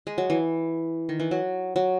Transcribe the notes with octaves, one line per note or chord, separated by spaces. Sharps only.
G#3
F#3
E3
D#3
E3
F#3
F#3